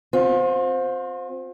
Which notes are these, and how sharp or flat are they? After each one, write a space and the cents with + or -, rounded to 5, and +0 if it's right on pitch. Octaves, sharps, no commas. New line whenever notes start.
C4 +0 F4 +40